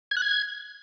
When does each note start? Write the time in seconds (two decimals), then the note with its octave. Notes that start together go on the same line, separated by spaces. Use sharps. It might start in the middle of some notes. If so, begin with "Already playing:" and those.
0.11 G#6
0.17 F#6
0.22 G#6